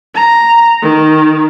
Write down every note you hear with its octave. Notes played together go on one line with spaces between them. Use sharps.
A#5
D#3